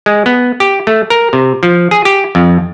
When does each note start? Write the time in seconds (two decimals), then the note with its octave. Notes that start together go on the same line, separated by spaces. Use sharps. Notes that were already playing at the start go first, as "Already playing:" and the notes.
0.06 G#3
0.26 B3
0.60 G4
0.87 A3
1.10 A#4
1.33 C3
1.63 F3
1.91 G#4
2.05 G4
2.35 F2